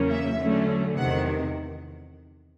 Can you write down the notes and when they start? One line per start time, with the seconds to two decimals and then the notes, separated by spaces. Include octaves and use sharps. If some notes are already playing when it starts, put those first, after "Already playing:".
Already playing: E2 C#3 F#3 A#3 C#4
0.10 E5
0.39 D3 F#3 A3 C#4
0.97 E2 C3 D#3 F#5